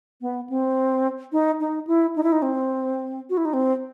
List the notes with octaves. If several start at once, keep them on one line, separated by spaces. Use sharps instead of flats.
B3
C4
D#4
D#4
E4
D#4
E4
D#4
C4
F#4
E4
D#4
C4